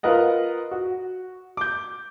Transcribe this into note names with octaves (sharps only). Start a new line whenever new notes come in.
F4 A#4 B4 D#5 F#5
F#4
D6 G6